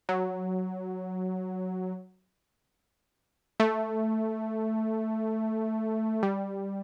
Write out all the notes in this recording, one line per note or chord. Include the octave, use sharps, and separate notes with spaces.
F#3
A3
G3